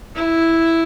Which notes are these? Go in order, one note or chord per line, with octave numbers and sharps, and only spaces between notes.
E4